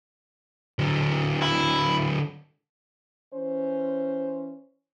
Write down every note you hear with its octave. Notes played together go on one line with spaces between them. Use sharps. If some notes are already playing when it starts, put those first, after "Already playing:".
D3 F#3
E4
E3 C#4 C5